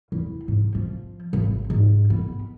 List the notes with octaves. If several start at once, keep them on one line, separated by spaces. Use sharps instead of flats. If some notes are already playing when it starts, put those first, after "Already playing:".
E2
G#2
F3
G#1
G#2
B3